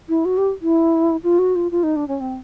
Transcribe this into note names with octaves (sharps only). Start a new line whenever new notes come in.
E4
F#4
G4
E4
F4
F#4
F4
F4
D#4
D4
C#4
C4